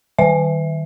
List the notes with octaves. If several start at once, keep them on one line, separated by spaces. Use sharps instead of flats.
D#3 E5